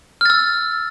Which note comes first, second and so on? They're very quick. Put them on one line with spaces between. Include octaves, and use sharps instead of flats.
F6 A6 E6